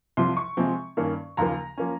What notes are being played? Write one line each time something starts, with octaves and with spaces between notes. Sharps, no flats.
C2 C3 F3 C6
C#6
C3 F3 G#3 C4
G2 D#3 A#3 C#4
D#2 C#3 F3 A#3 A#5
F3 A#3 C#4